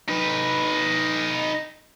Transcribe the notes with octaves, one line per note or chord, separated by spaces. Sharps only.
D#4 B4